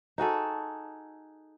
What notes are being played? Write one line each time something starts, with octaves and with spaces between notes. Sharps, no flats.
D#4 F#4 G#4 A4